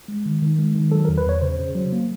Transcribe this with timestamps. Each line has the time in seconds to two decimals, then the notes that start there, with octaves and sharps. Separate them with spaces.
0.08 G#3
0.26 D#3
0.42 D#3
0.58 G#3
0.75 D#3
0.92 F#3 A4
1.05 A#4
1.08 E2
1.18 B4
1.26 E2 C#5
1.41 C#3 C5
1.59 C#3
1.75 F#3
1.92 A#3